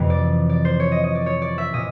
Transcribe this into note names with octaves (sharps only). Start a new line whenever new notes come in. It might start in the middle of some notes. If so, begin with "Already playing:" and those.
Already playing: F2 C3 E3
D5
D5
C5
C#5
D#5
D#5
D5
C#5
D5
E5
A#2 D#5